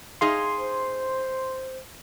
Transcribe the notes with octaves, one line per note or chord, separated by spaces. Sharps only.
D#4 G#4 F5 C6
C5